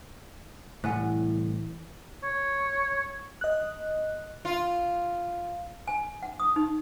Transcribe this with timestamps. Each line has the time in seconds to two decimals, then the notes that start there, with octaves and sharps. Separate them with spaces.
0.84 C2 A2 E3 F#5 G#5 F#6
2.24 C#5
3.41 D#5 F#6
4.45 F4
5.87 G#5
6.23 F#5
6.40 D#6
6.56 D#4